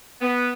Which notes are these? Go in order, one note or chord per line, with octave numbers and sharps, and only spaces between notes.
B3